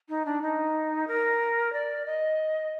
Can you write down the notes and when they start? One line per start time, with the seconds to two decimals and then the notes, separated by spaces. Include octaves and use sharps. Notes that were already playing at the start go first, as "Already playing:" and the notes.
0.09 D#4
0.25 D4
0.42 D#4
1.08 A#4
1.73 D5
2.06 D#5